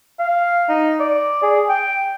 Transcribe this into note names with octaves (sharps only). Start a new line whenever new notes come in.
F5
D#4
D5
G#4
G5